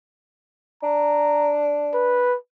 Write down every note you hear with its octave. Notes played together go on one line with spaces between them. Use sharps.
D4 A#5
B4